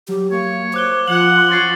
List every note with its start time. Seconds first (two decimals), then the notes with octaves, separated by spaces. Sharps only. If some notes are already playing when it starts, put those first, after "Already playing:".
0.08 F#3 G4
0.31 A#3 C#5
0.74 C5 D6 F#6 G7
1.08 F3 F#5 F#7
1.37 C6
1.50 C#4 F#6 A6 C7